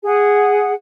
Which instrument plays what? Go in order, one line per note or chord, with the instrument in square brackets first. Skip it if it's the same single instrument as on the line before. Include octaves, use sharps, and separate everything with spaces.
[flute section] G#4 F#5